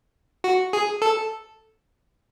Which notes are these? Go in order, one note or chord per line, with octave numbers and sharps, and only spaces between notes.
F#4
G#4
A4